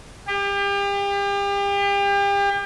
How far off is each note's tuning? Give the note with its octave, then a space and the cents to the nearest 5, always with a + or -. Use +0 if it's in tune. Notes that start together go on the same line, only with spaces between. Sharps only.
G4 +35